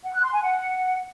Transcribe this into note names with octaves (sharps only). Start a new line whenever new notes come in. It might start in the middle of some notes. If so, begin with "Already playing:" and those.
F#5
F#6
C6
G#5
F#5